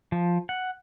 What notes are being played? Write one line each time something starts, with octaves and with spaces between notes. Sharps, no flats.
F3
F#5